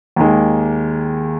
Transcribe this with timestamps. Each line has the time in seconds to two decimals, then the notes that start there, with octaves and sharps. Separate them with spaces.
0.16 D#2 D#3 G#3